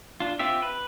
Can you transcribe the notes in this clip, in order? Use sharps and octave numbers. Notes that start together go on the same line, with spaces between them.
D4 F4
C4 F4 G4 E5
B4